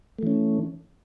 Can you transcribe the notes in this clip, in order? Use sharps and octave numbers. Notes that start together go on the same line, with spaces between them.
E3 A3 C#4